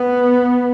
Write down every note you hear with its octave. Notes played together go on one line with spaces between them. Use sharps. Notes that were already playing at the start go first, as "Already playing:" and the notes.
Already playing: B3